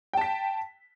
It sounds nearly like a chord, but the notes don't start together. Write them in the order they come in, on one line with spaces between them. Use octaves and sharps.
G5 A5 B6